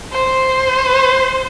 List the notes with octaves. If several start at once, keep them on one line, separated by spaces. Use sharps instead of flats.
C5